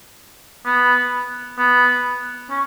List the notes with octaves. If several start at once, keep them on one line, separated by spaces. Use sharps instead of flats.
B3
B3
C#4